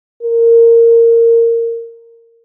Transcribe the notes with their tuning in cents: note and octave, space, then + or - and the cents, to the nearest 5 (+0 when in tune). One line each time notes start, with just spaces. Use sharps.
A#4 -15